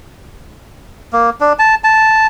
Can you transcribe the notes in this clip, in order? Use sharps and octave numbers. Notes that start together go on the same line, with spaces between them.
A#3
D4
A5
A5